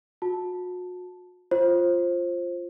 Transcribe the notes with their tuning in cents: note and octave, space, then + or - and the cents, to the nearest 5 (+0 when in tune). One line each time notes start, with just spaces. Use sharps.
F#4 -35 A5 +0
F4 +0 C5 +20